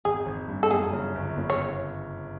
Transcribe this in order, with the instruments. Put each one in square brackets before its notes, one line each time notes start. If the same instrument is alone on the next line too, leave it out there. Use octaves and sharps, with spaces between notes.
[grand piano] G#1 [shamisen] G#4
[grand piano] G#1
G2
[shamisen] A4
[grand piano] F#2 [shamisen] G#4
[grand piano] C#3
G1
C#3
[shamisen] C#5